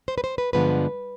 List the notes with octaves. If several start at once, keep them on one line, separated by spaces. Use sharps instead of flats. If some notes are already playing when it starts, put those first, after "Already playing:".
C5
B4
C5
B4
G2 D3 F3 G#3 B3 B4